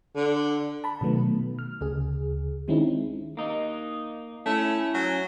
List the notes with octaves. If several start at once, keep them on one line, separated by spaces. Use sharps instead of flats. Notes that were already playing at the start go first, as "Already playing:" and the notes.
D3
A5 B5
B2 D#3 F#3 A3 B3
F6
D2 C#3 G#4
D#3 G#3 C4 C#4 D#4 E4
A#3 D#4
A3 C#4 E4
F#3